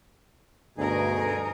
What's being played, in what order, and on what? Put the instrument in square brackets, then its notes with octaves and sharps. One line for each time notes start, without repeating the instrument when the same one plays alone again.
[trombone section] D2 B2 [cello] G2 A#4 [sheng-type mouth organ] D#4 G#4